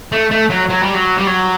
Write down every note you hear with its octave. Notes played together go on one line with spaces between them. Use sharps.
A3
A3
F#3
F#3
G3
F#3
G3
F#3